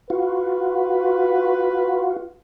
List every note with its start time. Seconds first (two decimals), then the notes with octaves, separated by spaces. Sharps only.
0.10 F4 F#4 B4